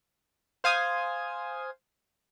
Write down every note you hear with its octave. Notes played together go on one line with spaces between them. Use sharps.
C5 F5 G#5 D#6 G#6